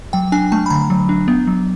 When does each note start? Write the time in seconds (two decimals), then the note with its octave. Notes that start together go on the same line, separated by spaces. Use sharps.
0.13 F#3 G5
0.32 D4 G#5
0.52 A3 A5
0.66 B5
0.70 D3 A#5
0.90 F#3
1.09 D4
1.28 B3
1.47 F#3